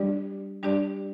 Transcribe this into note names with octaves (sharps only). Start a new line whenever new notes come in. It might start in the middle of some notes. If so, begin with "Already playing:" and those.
Already playing: G3 D4 G4 D5
G3 D4 G4 D5